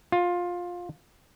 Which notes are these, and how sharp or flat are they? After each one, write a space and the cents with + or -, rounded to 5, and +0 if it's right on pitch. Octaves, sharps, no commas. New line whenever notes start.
F4 +15